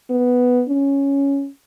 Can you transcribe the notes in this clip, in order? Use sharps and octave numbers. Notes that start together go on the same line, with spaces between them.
B3
C#4